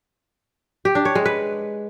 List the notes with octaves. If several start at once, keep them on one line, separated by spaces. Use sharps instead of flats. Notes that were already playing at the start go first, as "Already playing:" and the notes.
G4
D4
C#5
G#3
B4